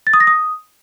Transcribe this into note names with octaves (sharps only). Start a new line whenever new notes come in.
A6
D#6
A#6
D#6